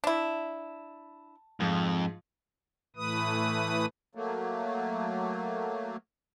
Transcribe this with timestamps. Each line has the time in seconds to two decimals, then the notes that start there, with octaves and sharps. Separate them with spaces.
0.04 D4 E4 A5
1.60 F2 G#2 F3 F4
2.96 A2 E3 A3 B4 D#6
4.15 F#3 A3 A#3